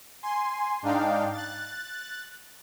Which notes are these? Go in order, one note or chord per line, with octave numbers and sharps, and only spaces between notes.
G#5 C6
G#2 D4 D#4 F5 G5
F#6 A6